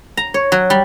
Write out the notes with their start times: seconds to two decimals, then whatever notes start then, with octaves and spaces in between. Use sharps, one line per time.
0.17 A#5
0.34 C#5
0.52 F#3
0.70 G3